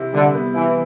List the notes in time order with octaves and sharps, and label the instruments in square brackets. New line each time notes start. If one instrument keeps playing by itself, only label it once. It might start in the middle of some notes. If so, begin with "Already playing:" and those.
Already playing: [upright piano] C3 E4
[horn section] D3 [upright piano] G3
[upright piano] B3
[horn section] E3 [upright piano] E4